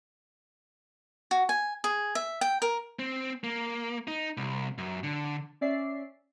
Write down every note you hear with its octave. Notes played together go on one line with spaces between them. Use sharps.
F#4
G#5
G#4
E5
G5
A#4
C4
A#3
D#4
C2
F#2
D3
C#4 D5 E5 C7